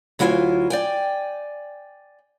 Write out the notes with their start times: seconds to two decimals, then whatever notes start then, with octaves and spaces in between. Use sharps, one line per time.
0.19 D2 F#3 E4 F4 F#5 G#5
0.70 D5 G5 G#5